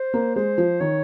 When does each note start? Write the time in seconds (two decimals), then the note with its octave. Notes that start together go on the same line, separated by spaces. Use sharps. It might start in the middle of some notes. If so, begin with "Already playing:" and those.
Already playing: C5
0.14 A#3
0.35 G#3 C5
0.58 F3
0.80 D#3 C#5